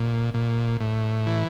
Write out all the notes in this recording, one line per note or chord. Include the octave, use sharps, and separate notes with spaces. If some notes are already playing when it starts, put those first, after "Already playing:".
Already playing: A#2
A#2
A2
E3